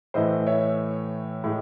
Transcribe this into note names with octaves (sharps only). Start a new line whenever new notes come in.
A2 E3 A3 C5 D#5
C#5 E5
A2 G#3